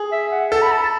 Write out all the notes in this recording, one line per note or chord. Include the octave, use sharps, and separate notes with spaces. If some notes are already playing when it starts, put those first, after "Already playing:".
Already playing: G#4
E5
F#5
A4 A5
B5
A5
A5